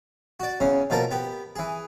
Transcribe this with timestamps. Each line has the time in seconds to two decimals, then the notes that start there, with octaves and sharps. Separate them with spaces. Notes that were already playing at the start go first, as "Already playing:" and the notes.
0.40 F#4 D5
0.60 E2 C#3 C#4
0.90 B2 F3 A#3 A4 A#4
1.11 B3 G4
1.56 E3 G#4